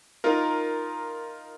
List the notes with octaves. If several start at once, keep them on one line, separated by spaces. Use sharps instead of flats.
D#4 F4 A#4